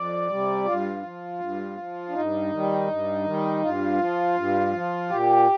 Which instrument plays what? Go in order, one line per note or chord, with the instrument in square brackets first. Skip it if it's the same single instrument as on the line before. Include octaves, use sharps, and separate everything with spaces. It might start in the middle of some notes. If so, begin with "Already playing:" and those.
Already playing: [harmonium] F2 D5
C3 G3
G2 F4
F3
G2
F3
D4
G2 D#4
D#3 G3
G2
D#3 G3
G2 F4
F3
G2
F3
A#2 G4